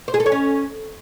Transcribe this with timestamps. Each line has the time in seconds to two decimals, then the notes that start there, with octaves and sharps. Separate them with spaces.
0.08 C5
0.14 G#4
0.20 A4
0.26 C#5
0.32 C#4